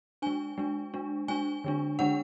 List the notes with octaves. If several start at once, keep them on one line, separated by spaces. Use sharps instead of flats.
G#3 D4 G#5
G#3 D4
G#3 D4
G#3 D4 G#5
D3 G#3 D4
D3 G#3 D4 F#5